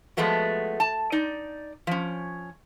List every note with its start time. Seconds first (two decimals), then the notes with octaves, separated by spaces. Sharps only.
0.17 F3 G#3 A3 B3 F#4
0.80 A5
1.12 D#4 D5
1.87 F3 C#4